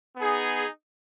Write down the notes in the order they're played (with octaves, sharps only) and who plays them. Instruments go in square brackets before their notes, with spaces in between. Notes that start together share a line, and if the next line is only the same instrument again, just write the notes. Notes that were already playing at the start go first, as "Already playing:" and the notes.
[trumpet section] B3 D#4 G#4